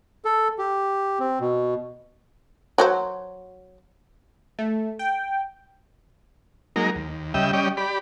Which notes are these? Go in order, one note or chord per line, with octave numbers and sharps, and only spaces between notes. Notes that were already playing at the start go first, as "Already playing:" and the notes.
A4
G4
C4
B2
F#3 F#4 C5
A3
G5
F#3 G#3 A#3 D#4 A#4
D#2
C#3 G3 D#5 E5 G5
G3 C#4 D5 D#5 G5
G4 D5 B5